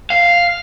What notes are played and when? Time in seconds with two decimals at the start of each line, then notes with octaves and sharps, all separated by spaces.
0.10 F5